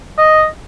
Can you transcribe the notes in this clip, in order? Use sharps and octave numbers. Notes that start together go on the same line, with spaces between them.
D#5